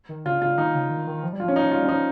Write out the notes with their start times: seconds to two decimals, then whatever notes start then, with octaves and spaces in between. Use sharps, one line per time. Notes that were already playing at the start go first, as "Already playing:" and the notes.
0.09 D#3
0.25 C#3 F4
0.41 C#3 F4
0.58 D#3 D#4
0.74 C#3
0.90 D#3
1.07 D#3
1.23 F3
1.33 G3
1.40 F4
1.43 F3
1.48 C#4
1.56 D#4
1.72 F4
1.76 G3
1.84 C#4
1.89 F3 D#4